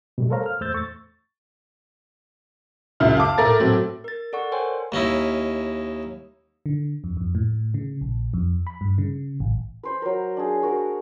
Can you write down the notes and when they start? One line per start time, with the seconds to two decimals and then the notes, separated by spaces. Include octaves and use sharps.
0.18 B2 G3 A3
0.30 A4 A#4 C5 C#5 F5 A#5
0.46 F6
0.61 E2 A3 C5 E6 G6 A6
0.74 C#6 A6
3.00 C#2 F#2 E4 F6
3.17 F5 A5 D6
3.38 A2 A3 A#4 A6
3.60 A2 F#3 C4
4.04 A#4 A6
4.33 A4 D5 F#5 C#6
4.52 A#4 C5 C#5 G5 G#5 C6
4.92 D#2 C#4 D#4 E4
6.66 D3
7.04 F2
7.17 F2
7.35 A2
7.74 C#3
8.01 A#1
8.34 F2
8.67 B5
8.81 G2
8.98 C#3
9.40 A1
9.83 B4 C5 B5
10.02 F#3 A#4
10.37 D4 G#4
10.63 F#4 A#4